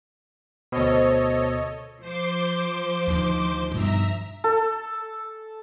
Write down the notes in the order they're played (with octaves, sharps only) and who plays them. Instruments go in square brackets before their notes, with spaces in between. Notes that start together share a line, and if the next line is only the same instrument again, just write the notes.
[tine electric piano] D2 B2 [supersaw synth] A4 C#5 D#5 [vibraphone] C5
[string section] F3 [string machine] C5 C6 D6
[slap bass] D2 D#3
[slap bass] G2 B2 D#3 [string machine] E5 A#5
[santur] A4